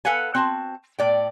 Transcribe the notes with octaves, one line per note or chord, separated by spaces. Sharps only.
A4 B4 F5 F#5 G#5
C4 F#4 A5
A2 D5 G5